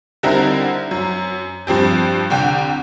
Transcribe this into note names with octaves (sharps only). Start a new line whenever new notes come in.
D3 G3 C4 D#4 E4 A#4
F#2
G2 F3 C4 G4
C2 D3 G5